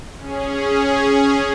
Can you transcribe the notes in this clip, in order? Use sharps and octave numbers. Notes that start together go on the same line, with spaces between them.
C#4 G#4